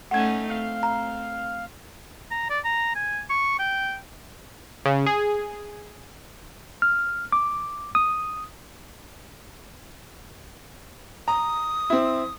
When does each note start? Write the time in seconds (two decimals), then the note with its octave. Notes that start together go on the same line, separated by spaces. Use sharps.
0.11 A3 C#4 D#4 F#5 G#6
0.50 C4 F5
0.83 A#5
2.31 A#5
2.50 D5
2.64 A#5
2.96 G#5
3.30 C#6
3.59 G5
4.85 C#3
5.06 G#4
6.82 F6
7.32 D6
7.95 D#6
11.28 A#5 D#6
11.90 C4 E4